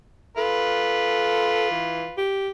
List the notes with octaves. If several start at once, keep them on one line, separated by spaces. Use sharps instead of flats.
F4 A4 B4
E3
G4